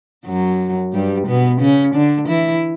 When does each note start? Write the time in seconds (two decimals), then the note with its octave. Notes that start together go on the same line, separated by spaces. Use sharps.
0.26 F#2 F#3
0.93 G2 G3
1.27 B2 B3
1.60 C#3 C#4
1.94 D3 D4
2.28 E3 E4